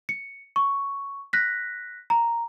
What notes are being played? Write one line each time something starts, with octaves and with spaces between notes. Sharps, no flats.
C#7
C#6
F#6 A#6 B6
A#5